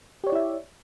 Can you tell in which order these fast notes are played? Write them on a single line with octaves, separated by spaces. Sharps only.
G4 C#5 D5 E4 E5